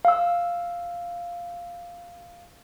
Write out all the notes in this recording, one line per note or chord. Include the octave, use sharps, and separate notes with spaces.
F5 E6